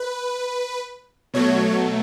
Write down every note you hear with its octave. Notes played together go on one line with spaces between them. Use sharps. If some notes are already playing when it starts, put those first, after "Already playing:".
Already playing: B4
B2 F#3 A3 C#5